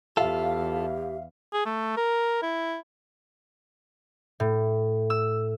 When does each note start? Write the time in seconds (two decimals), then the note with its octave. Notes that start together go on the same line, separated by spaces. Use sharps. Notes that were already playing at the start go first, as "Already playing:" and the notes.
0.17 E2 F4 G4 A4 E5 F5
1.53 G#4
1.65 A3
1.97 A#4
2.42 E4
4.40 A2
5.10 E6